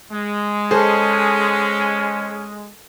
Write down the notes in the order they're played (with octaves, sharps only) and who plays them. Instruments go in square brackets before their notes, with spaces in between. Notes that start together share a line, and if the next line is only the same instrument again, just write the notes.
[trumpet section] G#3
[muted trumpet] C#4 [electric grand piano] G#4 C5 [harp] A4